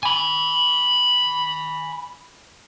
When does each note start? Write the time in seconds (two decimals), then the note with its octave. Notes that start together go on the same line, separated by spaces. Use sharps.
0.03 G#5 B5